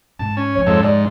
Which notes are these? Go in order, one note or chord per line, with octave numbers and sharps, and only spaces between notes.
G#2 A5
C#4
F3 B3 C#5
F2 G#2 A4
G#2 D5